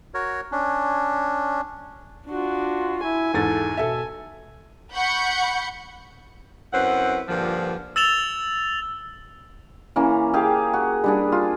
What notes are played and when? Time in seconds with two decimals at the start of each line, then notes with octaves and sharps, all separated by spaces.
0.14 F#4 A#4 C#5
0.52 C#4 D4
2.26 D4 F4 F#4
3.03 E4 G#5
3.34 E2 G#2 A4 A6
3.77 B2 A4 E5
4.93 F#5 B5 C#6 G6 C#7
6.73 F#2 C4 E4 B4 F#5
7.28 G2 A#2 D3 F3
7.96 E6 A6 E7 F7 G7
9.96 E3 A#3 C#4
10.33 G4 G#4 F5 G5
10.74 F#4
11.04 G3 D4 G#4
11.32 F4